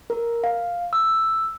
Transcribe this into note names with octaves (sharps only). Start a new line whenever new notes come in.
A#4
F5
E6